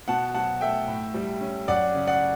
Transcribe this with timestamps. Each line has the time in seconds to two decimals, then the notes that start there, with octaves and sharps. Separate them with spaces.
0.08 B2 F#5 A5
0.34 F#3 F#5 A5
0.61 A3 E5 G5
0.88 A2
1.14 G3
1.41 C#4
1.68 F#2 D5 F#5
1.94 C#3
2.07 D5 F#5